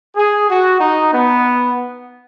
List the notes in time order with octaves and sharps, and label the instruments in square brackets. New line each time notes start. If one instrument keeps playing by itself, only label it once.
[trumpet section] G#4
F#4
D#4
B3